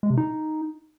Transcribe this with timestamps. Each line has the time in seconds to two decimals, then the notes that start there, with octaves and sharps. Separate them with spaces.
0.03 G#3
0.10 C3
0.18 D#4